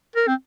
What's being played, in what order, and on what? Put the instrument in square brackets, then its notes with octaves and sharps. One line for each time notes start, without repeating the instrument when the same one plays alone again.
[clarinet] A#4
C4